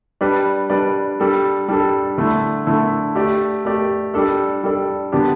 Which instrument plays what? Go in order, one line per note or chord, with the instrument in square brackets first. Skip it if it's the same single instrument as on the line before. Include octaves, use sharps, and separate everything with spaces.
[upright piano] G3 D4 B4 D5
G3 D4 B4 D5
G3 D4 A4
G3 D4 A4
D3 A3 E4
D3 A3 E4
A3 G4 D5
A3 G4 D5
G3 D4 A4 D5
G3 D4 A4 D5
D3 B3 D4 G4